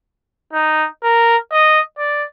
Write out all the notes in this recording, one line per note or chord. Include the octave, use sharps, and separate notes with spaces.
D#4
A#4
D#5
D5